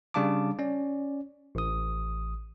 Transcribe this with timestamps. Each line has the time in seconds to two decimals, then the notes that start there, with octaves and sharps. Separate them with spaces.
0.14 C#3 G3 D4 F5 A5 D6
0.59 C#4 D5
1.55 A1 D#6